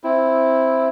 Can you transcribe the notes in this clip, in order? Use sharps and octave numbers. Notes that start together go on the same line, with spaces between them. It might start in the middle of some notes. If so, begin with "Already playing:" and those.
C4 E4